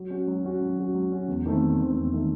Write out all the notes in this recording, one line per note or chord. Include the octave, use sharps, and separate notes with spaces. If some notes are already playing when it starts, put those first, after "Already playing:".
Already playing: F#3
C#4 F#4
F#3
C#4 F#4
F#3
C#4 F#4
F#3
C#4 F#4
E2
D#3 A3 C4
E2
D#3 A3 C4
E2
D#3 A3 C4